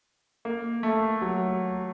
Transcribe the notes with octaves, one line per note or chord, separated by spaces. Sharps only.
A#3
A3
F#3